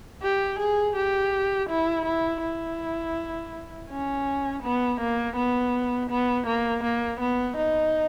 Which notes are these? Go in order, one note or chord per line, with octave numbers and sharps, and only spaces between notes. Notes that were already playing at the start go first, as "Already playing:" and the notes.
G4
G#4
G4
E4
E4
E4
C#4
B3
A#3
B3
B3
A#3
A#3
B3
D#4